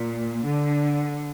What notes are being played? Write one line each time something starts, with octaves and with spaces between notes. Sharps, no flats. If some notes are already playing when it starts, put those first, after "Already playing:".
Already playing: A#2
D3